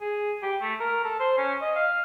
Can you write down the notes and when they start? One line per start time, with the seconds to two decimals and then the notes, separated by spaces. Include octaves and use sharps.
0.01 G#4
0.42 G4
0.61 A3
0.80 A#4
1.04 A4
1.20 C5
1.37 C#4
1.61 D#5
1.76 F5